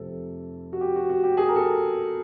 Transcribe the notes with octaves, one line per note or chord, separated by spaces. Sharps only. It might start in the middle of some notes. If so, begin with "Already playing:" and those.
Already playing: F1 F2 C3 A4
F#4
G4
F#4
F#4
G4
G#4
A#4
A4